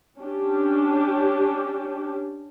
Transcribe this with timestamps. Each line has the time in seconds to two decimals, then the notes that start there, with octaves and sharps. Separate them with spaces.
0.19 C#4 D4 G4